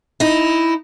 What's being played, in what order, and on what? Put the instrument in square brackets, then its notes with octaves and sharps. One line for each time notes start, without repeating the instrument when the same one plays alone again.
[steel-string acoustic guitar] D#4 E4